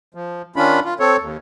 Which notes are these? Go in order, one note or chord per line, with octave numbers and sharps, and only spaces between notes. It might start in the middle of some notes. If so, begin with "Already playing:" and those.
F3
D#3 C#4 D4 F4 B5
F4
C4 A4 C#5
D#2